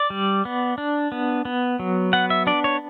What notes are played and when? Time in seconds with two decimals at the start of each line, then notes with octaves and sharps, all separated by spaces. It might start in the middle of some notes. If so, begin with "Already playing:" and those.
Already playing: D5
0.10 G3
0.45 B3
0.78 D4
1.12 B3
1.45 B3
1.79 F#3
2.13 B3 F#5
2.30 E5
2.47 D4 D5
2.64 C#5